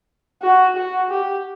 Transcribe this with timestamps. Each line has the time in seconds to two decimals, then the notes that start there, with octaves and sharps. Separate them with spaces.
0.42 F#4
0.76 F#4
1.10 G4